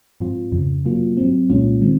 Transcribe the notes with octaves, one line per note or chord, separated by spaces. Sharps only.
G#2 F3 C4 F4
F2 C#3 F3
C3 F#3 A#3 F4
G#2 F#3 C4
C2 A#2 G#3 C#4 F4
D#3 G#3 C4